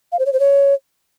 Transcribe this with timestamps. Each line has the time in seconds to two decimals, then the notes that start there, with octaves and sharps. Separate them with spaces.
0.12 F5
0.19 C5
0.26 C#5
0.33 C5
0.40 C#5